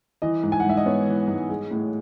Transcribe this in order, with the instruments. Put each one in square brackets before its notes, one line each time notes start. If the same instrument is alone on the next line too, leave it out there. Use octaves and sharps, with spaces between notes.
[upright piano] E3 D#5
G#2
G#5
F#5
G#2 E5
D#5
B3 C#5
E3
G#2
G#3
A2